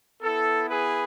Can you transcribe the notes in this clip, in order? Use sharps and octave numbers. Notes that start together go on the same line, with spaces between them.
B3 E4 A4
G#4 B4